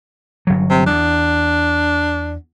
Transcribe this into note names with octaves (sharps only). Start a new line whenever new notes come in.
G1 F#3
C3
E2 D4